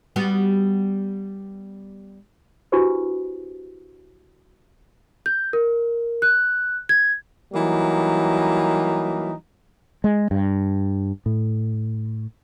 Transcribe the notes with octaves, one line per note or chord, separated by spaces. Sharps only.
G3 B3 F#4
D4 E4 F#4 G4 B4 C5
G6
A#4
F#6
G#6
E3 F#3 G3 A#3 D#4
G#3
G2
A2